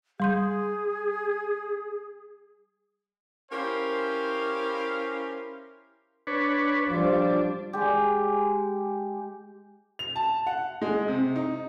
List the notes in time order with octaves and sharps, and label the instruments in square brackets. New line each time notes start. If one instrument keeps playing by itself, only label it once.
[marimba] G3 C6 G6 [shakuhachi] G#4
[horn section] C#4 E4 G4 A#4 C5 F5
[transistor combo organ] D4 B4 C#5
[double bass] F3 G3 [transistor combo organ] D4
[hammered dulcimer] G#3 G4
[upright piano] F7
A5
F#5
G#3
C3
D#4